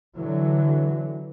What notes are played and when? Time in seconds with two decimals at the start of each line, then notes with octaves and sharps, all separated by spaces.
0.17 D3 E3 F#3